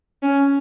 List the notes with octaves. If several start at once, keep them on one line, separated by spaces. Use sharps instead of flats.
C#4